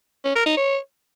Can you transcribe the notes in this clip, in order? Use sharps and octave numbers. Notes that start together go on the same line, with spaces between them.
C#4
A#4
D#4
C#5